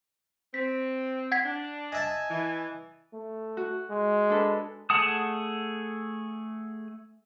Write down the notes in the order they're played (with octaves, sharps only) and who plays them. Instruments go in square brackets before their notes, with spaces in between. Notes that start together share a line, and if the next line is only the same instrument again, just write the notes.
[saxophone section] C4 [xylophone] B6
[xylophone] F#5 G#6 B6
[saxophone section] D4
[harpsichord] D#5 E5 A5 [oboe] G#5
[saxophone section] E3
[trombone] A3
[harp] F#4
[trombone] G#3
[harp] D4 A4 B4
[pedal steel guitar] A3 G#4 F#5 A5 D#6